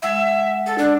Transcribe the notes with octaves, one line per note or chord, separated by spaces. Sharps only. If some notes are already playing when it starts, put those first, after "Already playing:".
G#3 E5 F#5 E6
A4
D4